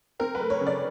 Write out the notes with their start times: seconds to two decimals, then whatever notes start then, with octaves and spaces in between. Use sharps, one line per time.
0.19 C4 A#4
0.35 B4
0.40 A3
0.50 C#5
0.61 C#3
0.66 D5